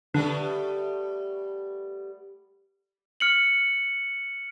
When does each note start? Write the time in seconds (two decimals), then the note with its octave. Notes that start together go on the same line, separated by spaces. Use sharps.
0.14 D3 G3 A3 B3
3.20 F6 C#7 F#7